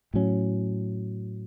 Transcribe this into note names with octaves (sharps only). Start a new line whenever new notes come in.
A2 F#3 C#4